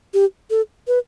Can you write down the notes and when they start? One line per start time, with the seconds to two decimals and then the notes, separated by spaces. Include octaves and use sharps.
0.14 G4
0.50 A4
0.88 B4